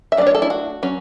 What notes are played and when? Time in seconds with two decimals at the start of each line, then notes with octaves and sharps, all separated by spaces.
0.12 E5
0.17 F#3 A3 D4 D5
0.27 C#5
0.35 A4
0.42 E4
0.50 F#4
0.83 F#3 C#4